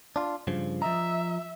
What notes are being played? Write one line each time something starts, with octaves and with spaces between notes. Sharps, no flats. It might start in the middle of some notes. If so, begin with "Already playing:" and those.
D4 F4
G2 C#3 F3
F3 D#5 E5 A#5